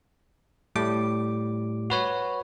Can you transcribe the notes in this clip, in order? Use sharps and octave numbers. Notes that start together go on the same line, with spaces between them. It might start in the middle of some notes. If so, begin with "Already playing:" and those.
A2 G3 D6
F#4 B4 C#5